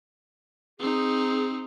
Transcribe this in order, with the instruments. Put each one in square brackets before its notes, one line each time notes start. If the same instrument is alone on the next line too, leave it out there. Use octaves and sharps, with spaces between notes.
[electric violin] C4 D#4 [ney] G#4